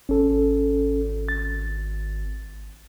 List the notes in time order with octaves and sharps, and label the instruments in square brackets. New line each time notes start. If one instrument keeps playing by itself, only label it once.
[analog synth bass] G#1 [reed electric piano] C#4 A4
[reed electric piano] A6